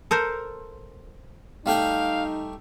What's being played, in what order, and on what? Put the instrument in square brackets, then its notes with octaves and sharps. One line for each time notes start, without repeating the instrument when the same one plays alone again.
[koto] A4 A#4 C5
[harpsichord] G3 A3 G5 [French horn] D#4 [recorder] F5